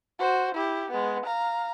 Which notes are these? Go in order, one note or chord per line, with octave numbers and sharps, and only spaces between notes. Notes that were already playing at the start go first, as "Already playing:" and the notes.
F#4 C5
E4 G4
G#3 B3
F5 A#5